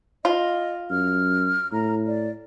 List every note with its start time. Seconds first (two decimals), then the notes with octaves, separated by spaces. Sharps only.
0.25 F4 D#5
0.91 F#2 F6
1.73 A2 A#5
2.07 D5